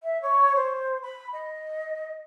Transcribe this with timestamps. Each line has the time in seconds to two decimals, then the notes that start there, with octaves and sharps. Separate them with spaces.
0.03 E5
0.22 C#5
0.55 C5
1.02 B5
1.33 D#5